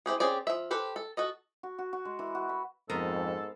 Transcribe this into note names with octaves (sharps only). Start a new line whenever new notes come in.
C4 E4 G4 G#4
C4 C#4 G4 G#4 D5
F3 E5
G4 A4 B4 C5
A4
F#4 A4 D#5
F#4
F#4
F#4
G#3
E3
F#4
B5
F2 G#2 B3 A4 A#4 C5